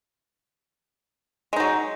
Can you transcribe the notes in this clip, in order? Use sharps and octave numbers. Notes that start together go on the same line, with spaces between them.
F#3 G#3 D#4